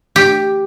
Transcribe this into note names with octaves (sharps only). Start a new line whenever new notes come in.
G4